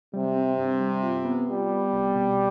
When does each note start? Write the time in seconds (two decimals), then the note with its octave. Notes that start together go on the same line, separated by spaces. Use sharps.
0.13 C3 G3
0.36 C4
0.58 G2
0.80 G3
1.02 F4
1.25 B3
1.48 G3 B3
1.69 B3
1.93 C2
2.15 B2